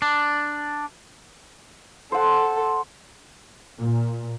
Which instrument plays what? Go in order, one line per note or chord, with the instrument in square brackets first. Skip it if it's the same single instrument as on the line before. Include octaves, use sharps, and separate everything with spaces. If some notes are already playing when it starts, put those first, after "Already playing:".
[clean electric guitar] D4
[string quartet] A4 [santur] C5 F#5
[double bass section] A#2